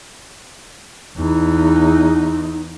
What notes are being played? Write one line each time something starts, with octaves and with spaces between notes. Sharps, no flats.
E2 D#4